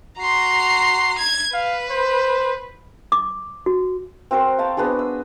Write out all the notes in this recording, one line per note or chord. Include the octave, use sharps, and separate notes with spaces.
F#4 A#5 C6
G#6
B4 F5
C5
D6
F#4
C4 F#4 A#4 C5
F5 G5 A5
B3 D4 F#4 G#4
E6